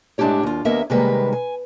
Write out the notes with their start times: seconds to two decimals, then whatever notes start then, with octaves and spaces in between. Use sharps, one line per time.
0.18 A2 G#3 D4 E4 G4 C#5
0.43 D#2 F4
0.65 D#2 A#3 B3 A#4 D#5 E5
0.90 C3 D#3 G3 G#3 A#3 B4
1.33 G#5